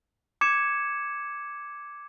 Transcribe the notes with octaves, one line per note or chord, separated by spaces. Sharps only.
D6 G#6 C#7 E7